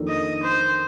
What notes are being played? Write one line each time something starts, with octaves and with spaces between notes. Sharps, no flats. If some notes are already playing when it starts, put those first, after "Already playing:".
Already playing: F2 D#3 A#3 D4 A4
D#5
C5